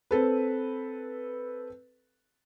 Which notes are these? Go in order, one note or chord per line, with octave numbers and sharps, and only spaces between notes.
C4 A4 B4